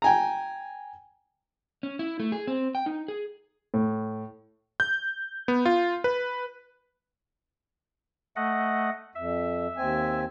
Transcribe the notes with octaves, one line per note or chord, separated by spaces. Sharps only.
G5 G#5 A#5
C#4
E4
A3
G#4
C4
G5
D#4
G#4
A2
G6
B3
F4
B4
A3 D#5 F#5
F2 E5
D#2 C4 G#5